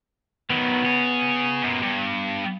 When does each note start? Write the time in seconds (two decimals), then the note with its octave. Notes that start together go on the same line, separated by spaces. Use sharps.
0.50 D#3 F#3 B3
0.86 G#4 C#5
1.63 F#2 A#2
1.83 G2